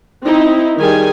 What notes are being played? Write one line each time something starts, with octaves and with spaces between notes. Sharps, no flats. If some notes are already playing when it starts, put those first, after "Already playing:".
C4 D#4 E4
D#3 G3 G4 G#4 G#5